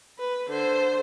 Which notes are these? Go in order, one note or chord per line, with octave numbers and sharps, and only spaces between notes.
B4
D3 C5